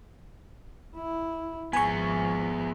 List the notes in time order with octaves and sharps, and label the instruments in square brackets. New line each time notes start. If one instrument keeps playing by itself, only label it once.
[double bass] E4
[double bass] G#1 F3 [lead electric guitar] B3 G#4 [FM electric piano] G#5 C#6